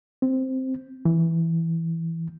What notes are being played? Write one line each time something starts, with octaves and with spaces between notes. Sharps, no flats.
C4
E3